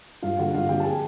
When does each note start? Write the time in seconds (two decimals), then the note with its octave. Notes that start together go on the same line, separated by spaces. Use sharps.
0.22 G2 F4 F5
0.38 D3 F#4 F#5
0.54 G2 F4 F5
0.69 D3 G4 G5
0.80 A5
0.85 G#4 G#5